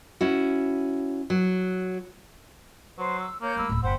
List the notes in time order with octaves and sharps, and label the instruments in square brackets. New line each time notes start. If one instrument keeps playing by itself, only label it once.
[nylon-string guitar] C#4 E4 F#4
F#3
[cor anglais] F#3 [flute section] B4 C5
[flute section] E6
[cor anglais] A#3 [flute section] C#5 G6
[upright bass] G3 A3 [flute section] B5 E6
[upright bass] D1 A2
[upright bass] F#1 [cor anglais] C5 [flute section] F#5 G5 B5